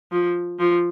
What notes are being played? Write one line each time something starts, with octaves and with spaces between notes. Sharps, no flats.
F3
F3